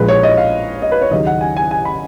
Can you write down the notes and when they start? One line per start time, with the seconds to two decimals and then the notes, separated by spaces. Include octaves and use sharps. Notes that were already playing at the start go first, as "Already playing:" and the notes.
Already playing: A#1 A#2 F3 G#3 B4
0.09 C#5
0.23 D#5
0.37 F5
0.82 D#5
0.92 B4
1.02 C#5
1.11 D#2 C#3 F#3 D#5
1.27 F#5
1.41 G#5
1.57 G#5
1.71 G#5
1.85 B5